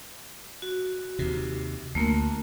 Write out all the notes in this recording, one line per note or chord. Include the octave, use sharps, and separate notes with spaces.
F#4
D#2 C3
D2 A3 A#3 A#4